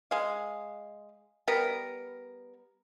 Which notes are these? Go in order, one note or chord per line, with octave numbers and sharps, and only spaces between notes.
G#3 F5
G3 B3 A#4